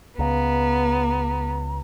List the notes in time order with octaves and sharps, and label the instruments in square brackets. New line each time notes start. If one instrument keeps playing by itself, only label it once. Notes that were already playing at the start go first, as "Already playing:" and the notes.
[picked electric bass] C#2 [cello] B3 [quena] A#5